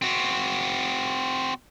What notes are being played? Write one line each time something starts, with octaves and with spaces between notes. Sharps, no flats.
C4 F#4